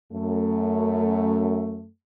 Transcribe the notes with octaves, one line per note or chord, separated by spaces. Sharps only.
F#2 A3